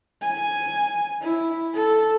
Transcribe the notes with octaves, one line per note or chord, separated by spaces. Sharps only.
G#5
E4
A4